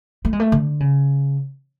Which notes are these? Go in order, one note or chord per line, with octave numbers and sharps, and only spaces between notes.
A3
G#3
A3
D3
C#3